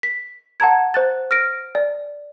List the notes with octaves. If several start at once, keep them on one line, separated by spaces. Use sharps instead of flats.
B6
F#5 A5 A#5 G#6
C5 F#6 A6
F6 A#6 D7
D5